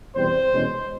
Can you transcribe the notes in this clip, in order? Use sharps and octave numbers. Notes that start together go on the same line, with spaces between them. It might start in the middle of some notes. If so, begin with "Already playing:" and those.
E2 B2 G3 C4 C5
E2 B2 G#3 C#4